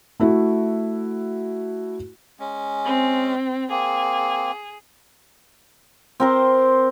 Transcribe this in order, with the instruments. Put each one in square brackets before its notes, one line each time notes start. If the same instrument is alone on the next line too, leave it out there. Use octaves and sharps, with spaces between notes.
[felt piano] A3 E4 F#4
[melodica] G#3 C#4
[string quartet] C4
[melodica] A#3 C4 [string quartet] G#4
[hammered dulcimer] C4 A#4 C5